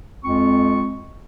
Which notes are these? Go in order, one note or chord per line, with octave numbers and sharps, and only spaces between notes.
F2 G#3 C4 F4 C#6